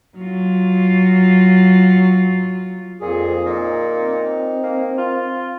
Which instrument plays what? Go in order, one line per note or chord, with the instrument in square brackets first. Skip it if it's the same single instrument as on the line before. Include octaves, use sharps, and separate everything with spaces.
[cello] F#3 F4
[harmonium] F2 G#4 [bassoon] A#2
[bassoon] A#2 [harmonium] D#4
[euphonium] C4
[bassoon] A#3
F4